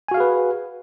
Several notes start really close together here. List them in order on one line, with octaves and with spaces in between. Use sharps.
G#5 F#4 F5 G#4 B4